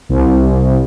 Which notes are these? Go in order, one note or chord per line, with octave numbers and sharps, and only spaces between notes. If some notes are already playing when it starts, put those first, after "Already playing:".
C2